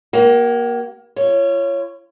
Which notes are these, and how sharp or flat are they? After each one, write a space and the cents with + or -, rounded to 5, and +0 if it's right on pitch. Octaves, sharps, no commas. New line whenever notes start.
A#3 +25 G4 -40
F4 -35 C#5 +0